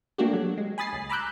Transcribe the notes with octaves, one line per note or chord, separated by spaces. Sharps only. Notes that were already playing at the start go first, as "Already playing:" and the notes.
A3 A#3 D4 F#4 G4
F#3
G#3
G#5 B5 D#6 A6 C7
C#2
A#5 B5 D6 E6 F#6 G6